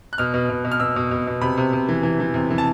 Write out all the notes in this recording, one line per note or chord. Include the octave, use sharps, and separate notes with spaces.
F#6
B2 F6
B2
B2
B2
F6
B2 E6
B2
B2
B2
C3 B5
C3
C3
E3
E3
E3
C3
E3
A5